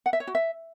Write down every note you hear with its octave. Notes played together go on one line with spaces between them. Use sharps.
F#5
E5
C#5
F#4
E5